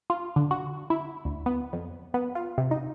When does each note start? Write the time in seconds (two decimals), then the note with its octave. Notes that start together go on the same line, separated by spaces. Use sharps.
0.10 F4
0.36 D3
0.51 F#4
0.90 E4
1.25 D2
1.46 B3
1.73 F2
2.14 B3
2.35 F4
2.58 C3
2.71 D#4